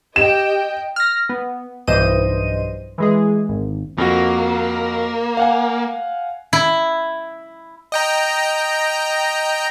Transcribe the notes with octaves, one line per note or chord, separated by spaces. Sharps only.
G4 D#5 G5 E7
F6 A#6
B3
B1 G2 E3 C5 D#5 D#7
E3 G#3 G#4
G#1
F2 A#3 F#4
F5 F#5 G#5
E4
D#5 G5 A#5